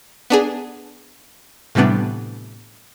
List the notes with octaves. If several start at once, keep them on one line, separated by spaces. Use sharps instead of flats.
B3 D4 G#4
A2 C3 E3 G3 B3 D4